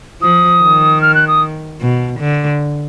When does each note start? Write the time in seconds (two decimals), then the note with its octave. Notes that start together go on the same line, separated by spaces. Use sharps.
0.22 F3 D#6
0.62 D#3
1.01 F6
1.14 F#6
1.27 D#6
1.81 B2
2.20 D3